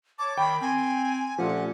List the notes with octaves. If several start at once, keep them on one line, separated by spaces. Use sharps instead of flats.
C#5 A5 D6
D#3 G5 B5
C4 G#5
A#2 F3 A3 C#4 G4 F#5